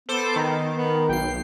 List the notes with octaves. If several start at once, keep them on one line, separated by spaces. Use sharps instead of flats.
B3 A4 C5 D6
D#3
B3
B1 G5 C7